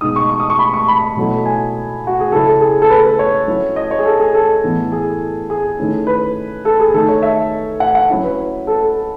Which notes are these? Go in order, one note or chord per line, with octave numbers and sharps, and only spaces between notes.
B2 G#3 D#4 D#6
C#6
C#6
D#6
C#6
B5
C#6
B5
B2 F#3 A3 E4
G#5
F#4
G#4
C#3 F#3 C#4 E4 A4
A4
G#4
A4
B4
B4
C#5
F#3 C#4 E4
D#5
C#5
G#4
A4
G#4
A4
A2 E3 B3 E4
G#4
G#4
D#3 A3 C#4 E4
B4
A4
G#4
D#3 A3 D#4 A4
C#5
E5
F#5
F#5
F#3 C#4 E4
B4
A4